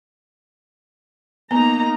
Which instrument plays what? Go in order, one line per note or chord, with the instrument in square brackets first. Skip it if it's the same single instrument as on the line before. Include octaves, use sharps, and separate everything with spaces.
[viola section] A#3 D#4 A#5 [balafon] B3